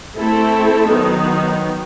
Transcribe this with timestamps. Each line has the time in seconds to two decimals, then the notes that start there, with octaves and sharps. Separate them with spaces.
0.17 A3 C4 E4 A4
0.89 D#3 F#3 B3 D#4